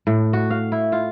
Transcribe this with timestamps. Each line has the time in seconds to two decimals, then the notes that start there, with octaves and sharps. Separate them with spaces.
0.07 A2
0.33 F#4
0.50 F5
0.72 E4
0.92 F4